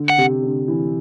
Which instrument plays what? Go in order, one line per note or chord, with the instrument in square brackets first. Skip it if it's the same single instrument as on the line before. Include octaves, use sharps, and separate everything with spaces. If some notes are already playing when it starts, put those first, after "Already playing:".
Already playing: [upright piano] D3
[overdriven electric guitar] F#5
[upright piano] C3
D3
E3